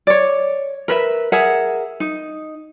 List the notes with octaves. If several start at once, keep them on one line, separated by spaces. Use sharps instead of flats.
C#5 D5
A#4 B4 E5
G#4 A#4 E5 F#5
D#4